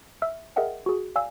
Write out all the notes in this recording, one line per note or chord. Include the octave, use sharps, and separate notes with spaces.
E5 E6 F6
G#4 A#4 D#5 E5 F#5 G5
F#4 G#4
D5 F5 G#5 E6